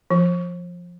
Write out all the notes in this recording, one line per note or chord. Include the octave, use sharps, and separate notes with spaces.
F3